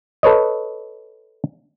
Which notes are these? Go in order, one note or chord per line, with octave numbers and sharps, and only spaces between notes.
A4 B4 C#5 D#5